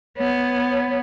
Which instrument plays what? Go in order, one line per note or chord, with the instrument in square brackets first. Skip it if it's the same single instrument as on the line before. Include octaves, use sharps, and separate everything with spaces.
[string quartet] B3 [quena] C#5